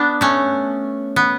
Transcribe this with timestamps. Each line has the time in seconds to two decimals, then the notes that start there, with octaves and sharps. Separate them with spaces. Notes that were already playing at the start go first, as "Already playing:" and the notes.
Already playing: B3 D4
0.21 A3 C#4
1.16 B3